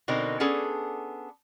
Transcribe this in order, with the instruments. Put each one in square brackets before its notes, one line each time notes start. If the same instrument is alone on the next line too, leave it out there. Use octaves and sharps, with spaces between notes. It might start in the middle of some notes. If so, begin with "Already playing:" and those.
[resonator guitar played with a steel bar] B2 D3 C4 D#4 A#4
B3 C#4 D4 G#4 A4